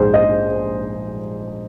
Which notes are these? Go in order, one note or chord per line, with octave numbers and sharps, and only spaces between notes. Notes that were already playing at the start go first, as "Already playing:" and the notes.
Already playing: A#1 G#2 G#4 C5
D#5